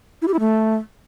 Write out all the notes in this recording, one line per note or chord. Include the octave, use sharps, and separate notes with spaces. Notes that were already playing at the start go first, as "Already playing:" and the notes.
E4
G4
E4
A3